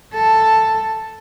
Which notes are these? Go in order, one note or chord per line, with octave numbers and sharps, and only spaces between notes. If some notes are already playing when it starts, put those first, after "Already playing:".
A4